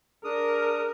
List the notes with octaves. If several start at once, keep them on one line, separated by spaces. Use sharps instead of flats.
D4 G#4 A#4 D#6